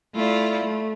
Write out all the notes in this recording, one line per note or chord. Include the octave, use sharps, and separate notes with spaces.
A3 E4 F4 D5
A3